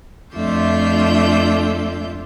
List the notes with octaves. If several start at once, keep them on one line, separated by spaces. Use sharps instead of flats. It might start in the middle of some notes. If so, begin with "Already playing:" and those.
F2 A3 D4 F4 E5 G6